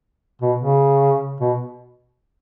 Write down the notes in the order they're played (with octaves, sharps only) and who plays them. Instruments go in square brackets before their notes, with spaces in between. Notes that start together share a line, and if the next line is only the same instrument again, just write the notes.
[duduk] B2
C#3
B2